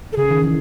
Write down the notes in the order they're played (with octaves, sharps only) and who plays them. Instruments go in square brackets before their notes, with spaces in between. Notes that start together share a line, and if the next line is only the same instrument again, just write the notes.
[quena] A4
[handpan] C#3 [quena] G#4
[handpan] D#3
E3